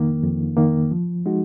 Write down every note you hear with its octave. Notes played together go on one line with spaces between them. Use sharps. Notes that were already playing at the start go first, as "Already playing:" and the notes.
Already playing: F2 D#3 A#3
F2
D#3 A#3
F3
G#3 D#4 F#4